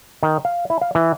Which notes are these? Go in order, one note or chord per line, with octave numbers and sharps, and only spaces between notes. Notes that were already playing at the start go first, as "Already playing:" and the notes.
D#3
F5
E4
F5
E3